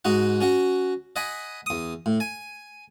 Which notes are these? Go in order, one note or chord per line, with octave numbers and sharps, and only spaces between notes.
G#2 D#4 F#4 F#5
C#4 F#4 F#5
D#5 F#5 G#5 B5
E2 D#6
A2
G#5